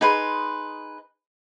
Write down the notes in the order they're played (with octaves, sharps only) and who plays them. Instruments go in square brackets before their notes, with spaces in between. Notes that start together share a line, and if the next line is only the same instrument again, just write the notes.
[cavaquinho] D#4 G#4 B4 C6